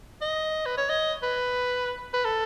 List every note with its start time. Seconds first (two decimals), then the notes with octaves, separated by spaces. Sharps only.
0.22 D#5
0.66 B4
0.77 C#5
0.89 D#5
1.23 B4
2.14 B4
2.25 A4